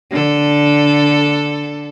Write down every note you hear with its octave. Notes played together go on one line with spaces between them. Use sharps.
D3 A4